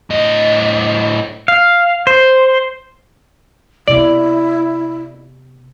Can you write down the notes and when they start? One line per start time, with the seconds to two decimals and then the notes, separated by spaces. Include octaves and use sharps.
0.10 A2 D#5
1.48 F5
2.07 C5
3.88 C3 B3 E4 D5